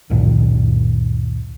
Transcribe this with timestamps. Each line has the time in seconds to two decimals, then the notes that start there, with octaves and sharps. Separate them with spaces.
0.10 C#2 F#2 A#2 D#3